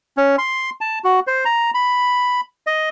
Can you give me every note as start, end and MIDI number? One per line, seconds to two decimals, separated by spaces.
0.17 0.36 61
0.38 0.70 84
0.81 0.99 81
1.04 1.20 66
1.27 1.44 72
1.45 1.71 82
1.74 2.41 83
2.67 2.89 75